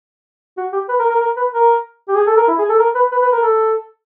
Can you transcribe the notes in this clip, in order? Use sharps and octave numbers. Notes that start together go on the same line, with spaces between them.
F#4
G4
B4
A#4
A#4
A#4
B4
A#4
G4
G#4
A4
A#4
E4
G#4
A4
A#4
B4
B4
B4
A#4
A4